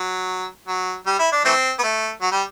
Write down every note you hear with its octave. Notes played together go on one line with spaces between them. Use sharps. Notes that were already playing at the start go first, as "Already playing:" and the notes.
Already playing: F#3
F#3
G3
E4
D4
E3 A3 C4
B3
A3
F#3
G3